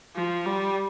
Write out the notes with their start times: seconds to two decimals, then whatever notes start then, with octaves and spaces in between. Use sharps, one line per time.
0.15 F3
0.46 G3